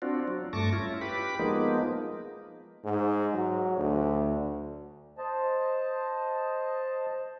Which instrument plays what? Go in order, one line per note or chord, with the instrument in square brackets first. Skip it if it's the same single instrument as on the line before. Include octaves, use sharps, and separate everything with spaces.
[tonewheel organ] C4 D4 F4 F#4
F#3
G2 A3 A5 C#6 D6 A#6
C#4 E4 F4
G4 B4 B5 D6
F3 G#3 A#3 B3 D#4
[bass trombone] G#2
F#3
D2
[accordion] C5 D#5 A5